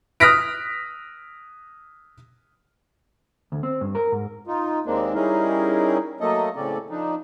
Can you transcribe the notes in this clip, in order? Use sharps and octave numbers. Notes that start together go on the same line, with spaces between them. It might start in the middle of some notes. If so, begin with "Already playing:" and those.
D#6 F6 F#6 A#6 B6 D7
D2
C4
G2
A#4
G#2
D#4 F4
D#2 G#3 A#3 C4 D4
G3 C#4 D#4 E4 G#4 A#4
F#3 A3 A#3 A4 D#5
A2 C#3 C4 C#4 A4 D5
F3 D4 D#4